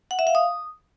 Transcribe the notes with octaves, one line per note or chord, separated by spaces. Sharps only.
F#5
E5
F5
D#6